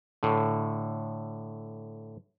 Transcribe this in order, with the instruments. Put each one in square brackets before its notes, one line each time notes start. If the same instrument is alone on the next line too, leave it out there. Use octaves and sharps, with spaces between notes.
[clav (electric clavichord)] A2 D3